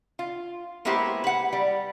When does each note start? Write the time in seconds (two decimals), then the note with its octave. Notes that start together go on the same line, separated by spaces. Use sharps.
0.19 F4
0.85 G#3 A#3 B3 E4 G4 C5
1.24 B4 F#5
1.53 G3